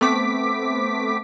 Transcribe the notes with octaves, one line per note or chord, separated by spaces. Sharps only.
A3 B3 C4 D6 B6